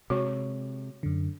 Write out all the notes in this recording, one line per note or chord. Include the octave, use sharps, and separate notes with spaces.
C3 G#3 F#4 C#5 C#6
F#2 D3